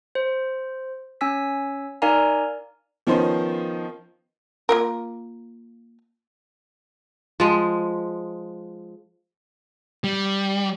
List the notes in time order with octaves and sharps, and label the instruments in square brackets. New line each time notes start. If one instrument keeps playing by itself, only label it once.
[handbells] C5
C#4 G#5 E6 B6
D#4 A#4 D5 F5 G#5 A#5
[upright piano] D#3 F3 B3 C#4 D#4 C5
[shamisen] A#3 F4 A#4
[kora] F3 G#3
[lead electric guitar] G3